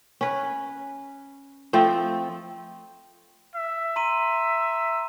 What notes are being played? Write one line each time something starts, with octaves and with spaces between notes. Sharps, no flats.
C#4 B4
F3 A3 C4 A4
E5
A#5 C6 D#7